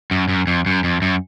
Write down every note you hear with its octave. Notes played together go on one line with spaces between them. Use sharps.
F#2
F#2
F2
F#2
F2
F#2